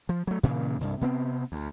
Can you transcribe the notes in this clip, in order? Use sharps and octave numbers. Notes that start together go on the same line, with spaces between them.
F3
F#3 A3
G2 A#2 C#3 E3
C2 G2
C3 B3 C4
D2